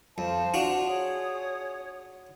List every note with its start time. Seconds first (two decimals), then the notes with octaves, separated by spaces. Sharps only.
0.18 F2 C5 F5 A5
0.54 D4 F4 F#4
0.87 G#4 C#5 D#6